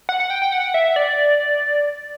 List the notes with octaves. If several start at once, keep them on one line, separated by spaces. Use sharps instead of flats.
F#5
F#5
G5
G5
F#5
E5
D5